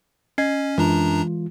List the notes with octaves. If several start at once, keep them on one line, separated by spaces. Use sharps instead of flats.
C#4 D#5 G#6 C7
F#2 E3 G#3 D4 F4 A#5